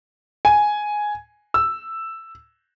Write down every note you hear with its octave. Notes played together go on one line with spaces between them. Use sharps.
G#5
E6